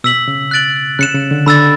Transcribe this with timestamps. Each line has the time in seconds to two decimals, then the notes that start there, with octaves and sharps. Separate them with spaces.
0.04 B2 E6 B6 F#7
0.28 C#3
0.51 F#6 A6 D7 F#7
0.99 C#3 F#6 C#7 E7
1.14 C#3
1.31 D3
1.46 D3 B5 E6 A6